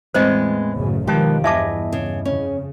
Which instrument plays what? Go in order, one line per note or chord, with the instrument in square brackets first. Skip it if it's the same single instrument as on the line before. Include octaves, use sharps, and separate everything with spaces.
[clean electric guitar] E2 A2 E3 [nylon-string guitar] G#3 B3 C4 [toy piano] C5 D#5
[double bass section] A1 F#2 C#3
[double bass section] B2 D#3 F3 [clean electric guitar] G#3 B4 A5 [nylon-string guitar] G4
[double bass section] E2 G2 [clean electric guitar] E4 D#5 G#5 [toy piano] E5 A5 D6
[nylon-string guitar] C#3
[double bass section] F2 C#3 [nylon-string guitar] C#4